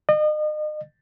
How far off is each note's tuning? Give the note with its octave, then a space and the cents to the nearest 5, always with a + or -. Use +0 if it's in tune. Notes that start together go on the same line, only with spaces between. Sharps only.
D#5 -35